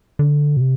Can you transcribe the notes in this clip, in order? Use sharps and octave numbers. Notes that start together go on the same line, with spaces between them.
D3
B2
C3